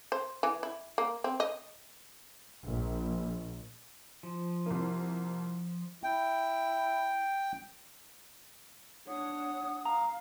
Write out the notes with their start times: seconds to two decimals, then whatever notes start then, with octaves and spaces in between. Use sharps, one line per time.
0.12 C5
0.43 E3
0.63 E4
0.98 A#3
1.24 C4
1.40 D#5
2.67 A#1
4.23 F3
4.66 C2 A#3
6.04 E4 G5
9.08 D4 C#5 F#5 D#6
9.86 F5 A#5